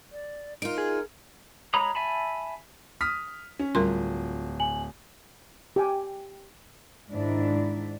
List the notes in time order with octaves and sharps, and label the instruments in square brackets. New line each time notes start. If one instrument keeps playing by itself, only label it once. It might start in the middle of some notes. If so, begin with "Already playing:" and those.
[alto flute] D5
[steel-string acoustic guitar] D#4 F4 [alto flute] A#4 [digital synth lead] D7
[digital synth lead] G#4
[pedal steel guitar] G#3 C#5 A#5 B5 D#6
E5 G#5 A5 B5
[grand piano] D#6 F6 B6
C#4
[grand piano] D1 [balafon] G3 A#4 C6 [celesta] F4
[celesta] G#5 F#7
[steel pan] G4 G5 G#5
[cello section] G#2 D#3 D4 E4